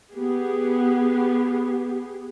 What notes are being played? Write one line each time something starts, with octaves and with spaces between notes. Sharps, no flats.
B3 G4 G#4